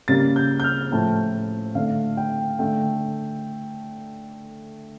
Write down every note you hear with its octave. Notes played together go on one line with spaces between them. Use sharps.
C#3 G3 A#3 A6
G6
G6
F6
A2 F3 A3 A5
D3 A3 F5
G5
D3 A3 G5